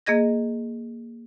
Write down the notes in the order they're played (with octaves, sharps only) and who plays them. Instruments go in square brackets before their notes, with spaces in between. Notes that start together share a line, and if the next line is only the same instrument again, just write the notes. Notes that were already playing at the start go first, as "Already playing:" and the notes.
[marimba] A#3 G#4 D#5 G#6 A#6